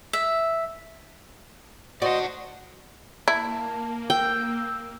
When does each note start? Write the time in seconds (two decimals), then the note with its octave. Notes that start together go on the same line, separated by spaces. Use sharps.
0.13 E5
2.02 F#4 C5 D5 D#5 F#5
3.28 A#3 E4 A5
4.10 G5 E6